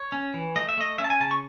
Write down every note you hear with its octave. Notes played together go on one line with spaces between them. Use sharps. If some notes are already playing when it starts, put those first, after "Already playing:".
Already playing: C#5
C#4
E3
A3 D#5
E5
A3 D#5
C#4 E5
A5
G#5
C#3 A5
C#6